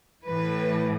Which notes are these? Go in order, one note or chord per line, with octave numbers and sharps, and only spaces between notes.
E3 B4
A2